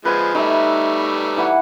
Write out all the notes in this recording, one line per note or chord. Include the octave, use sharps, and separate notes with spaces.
F3 G#3 B4 G#5
G3 A3 D#4 E5
E3 F#5